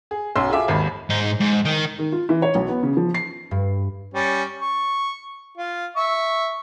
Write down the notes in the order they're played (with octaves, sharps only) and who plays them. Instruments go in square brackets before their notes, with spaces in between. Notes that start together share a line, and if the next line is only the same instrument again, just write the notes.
[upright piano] G#4
B1 C#4 C6 E6
F4 G#4 A4 E5 D6
G#1 D#2 B5
[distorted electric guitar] G#2 D#4
G#2
D#3
[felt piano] D#3
F4
E3
C#5
B1
B3
C#3
F3
C7
[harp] G2
[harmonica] G3 C#4
C#6
F4
E5 C#6